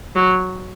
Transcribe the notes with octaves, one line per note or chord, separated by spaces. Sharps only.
F#3